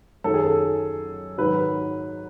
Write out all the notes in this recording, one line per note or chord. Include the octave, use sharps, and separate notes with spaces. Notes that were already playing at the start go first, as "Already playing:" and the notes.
F#2 D#3 F#3 A4
G#4
A4
G#2 D#3 F#3 B4